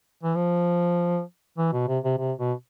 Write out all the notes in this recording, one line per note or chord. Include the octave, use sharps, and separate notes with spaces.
E3
F3
E3
B2
C3
C3
C3
B2